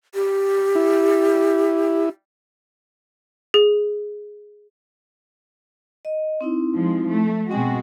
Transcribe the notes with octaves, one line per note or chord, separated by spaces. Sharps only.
G4
E4
G#4
D#5
C4 D#4 E4
F3 G#3
A3
B2 G#3 C4 F#4 G5 G#5